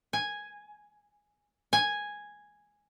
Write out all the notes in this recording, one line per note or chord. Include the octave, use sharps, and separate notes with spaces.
G#5
G#5